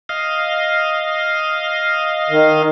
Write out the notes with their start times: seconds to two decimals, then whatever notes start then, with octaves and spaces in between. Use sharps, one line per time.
0.09 D#5 F5
2.30 D#3